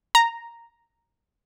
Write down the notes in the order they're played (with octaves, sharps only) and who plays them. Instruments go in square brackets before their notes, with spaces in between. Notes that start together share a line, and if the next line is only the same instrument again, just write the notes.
[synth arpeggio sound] A#5